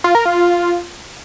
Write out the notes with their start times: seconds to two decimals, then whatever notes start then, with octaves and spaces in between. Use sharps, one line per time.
0.04 F4
0.15 A#4
0.25 F4